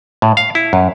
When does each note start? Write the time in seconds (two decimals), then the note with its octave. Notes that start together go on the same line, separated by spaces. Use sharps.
0.22 A2
0.37 F5
0.55 E4
0.73 F#2